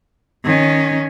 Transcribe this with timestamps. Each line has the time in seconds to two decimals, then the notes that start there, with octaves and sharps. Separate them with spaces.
0.45 D#3 C#4